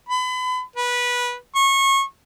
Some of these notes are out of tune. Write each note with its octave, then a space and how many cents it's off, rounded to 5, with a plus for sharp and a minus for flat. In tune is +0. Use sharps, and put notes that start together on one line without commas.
B5 +35
B4 -15
C#6 -25